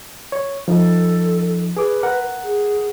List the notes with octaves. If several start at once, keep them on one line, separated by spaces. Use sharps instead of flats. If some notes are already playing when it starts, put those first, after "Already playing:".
C#5
F3 D#4 A4
G#4 B4 D6
A#4 F#5
G#4